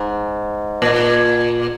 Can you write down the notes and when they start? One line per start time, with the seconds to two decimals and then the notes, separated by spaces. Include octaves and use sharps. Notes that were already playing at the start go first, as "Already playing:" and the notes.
Already playing: G#2
0.82 A#2